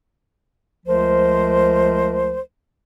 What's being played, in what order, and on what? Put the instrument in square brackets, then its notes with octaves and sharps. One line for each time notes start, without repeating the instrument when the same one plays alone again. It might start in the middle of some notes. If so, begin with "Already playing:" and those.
[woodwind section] C#2 F3 A3 A#4 C5